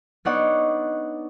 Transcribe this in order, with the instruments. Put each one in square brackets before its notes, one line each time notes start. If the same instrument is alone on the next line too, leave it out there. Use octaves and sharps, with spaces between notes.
[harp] B3 D4 D#4 C#5 D5 F#5